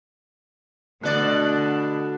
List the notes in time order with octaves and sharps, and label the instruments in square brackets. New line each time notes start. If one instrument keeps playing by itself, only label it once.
[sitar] B2 D5 [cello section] D3 [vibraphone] A3 F#4 D#6 [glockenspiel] F#6 A6